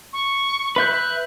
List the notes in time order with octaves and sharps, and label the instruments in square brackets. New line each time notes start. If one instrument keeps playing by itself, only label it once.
[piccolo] C#6
[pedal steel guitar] B4 E5 G6 [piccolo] F#6